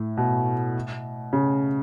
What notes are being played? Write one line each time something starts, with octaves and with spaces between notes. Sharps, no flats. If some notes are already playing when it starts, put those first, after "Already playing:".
Already playing: A2
B2
C#3